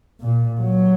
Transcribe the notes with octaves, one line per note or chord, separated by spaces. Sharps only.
A#2
F#3